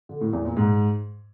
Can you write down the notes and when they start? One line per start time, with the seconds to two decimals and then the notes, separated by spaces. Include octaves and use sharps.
0.09 D3
0.21 A2
0.33 E2
0.45 A#2
0.57 G#2